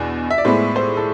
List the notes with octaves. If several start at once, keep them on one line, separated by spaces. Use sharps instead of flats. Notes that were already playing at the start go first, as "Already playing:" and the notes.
Already playing: E2 B2 D4
E5
D5
A2 G#3 B3 E4 C5
C5
A4